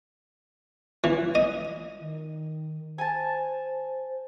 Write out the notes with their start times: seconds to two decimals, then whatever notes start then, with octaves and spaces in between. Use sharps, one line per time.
1.04 E3
1.35 D#5
2.00 D#3
2.98 C5 G#5 A5